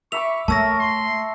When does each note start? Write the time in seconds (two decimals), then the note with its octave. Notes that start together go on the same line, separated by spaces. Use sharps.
0.12 E5 B5 C#6 D6 F7
0.48 A3 A#4 C#5 E5 A5 E6 A#6
0.79 C6